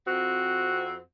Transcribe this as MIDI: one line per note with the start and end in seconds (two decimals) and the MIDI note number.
0.05 0.98 41
0.05 0.98 60
0.05 0.98 66